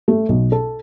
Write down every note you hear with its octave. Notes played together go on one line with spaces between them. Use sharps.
A3
B1
A4